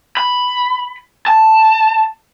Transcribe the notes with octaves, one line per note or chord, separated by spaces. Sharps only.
B5
A5